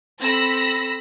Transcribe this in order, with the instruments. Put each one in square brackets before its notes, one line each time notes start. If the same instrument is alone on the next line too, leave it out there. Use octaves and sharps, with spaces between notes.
[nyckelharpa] C4 A4 [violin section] B5 E6 A#6